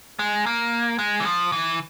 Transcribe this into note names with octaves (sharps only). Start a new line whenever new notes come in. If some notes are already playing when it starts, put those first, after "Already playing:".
G#3
A#3
G#3
E3
F3
E3